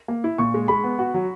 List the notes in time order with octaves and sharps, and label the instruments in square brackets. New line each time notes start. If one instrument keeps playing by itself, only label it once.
[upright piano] A#3
E4
[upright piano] A#2 [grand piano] C#6
[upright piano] G#3
[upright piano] G#3 [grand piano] B5
[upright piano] B3
F#4
F#3